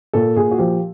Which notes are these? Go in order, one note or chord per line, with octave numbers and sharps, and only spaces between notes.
A#2 A4
A#2 G#4
F#4
F3 G4